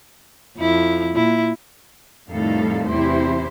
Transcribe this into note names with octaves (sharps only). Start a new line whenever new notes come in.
F2 E4
A#2 E4
F2 A2 D#3 G3 A4 F5
E2 C3 E4 G4 C5